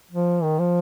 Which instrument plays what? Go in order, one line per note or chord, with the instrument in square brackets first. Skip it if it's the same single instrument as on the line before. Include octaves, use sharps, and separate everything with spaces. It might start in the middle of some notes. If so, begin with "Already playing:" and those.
[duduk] F3
D#3
F3